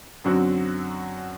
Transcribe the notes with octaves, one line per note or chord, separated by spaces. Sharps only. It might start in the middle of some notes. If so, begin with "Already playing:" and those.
F#2 D3 F#3 C4 F#4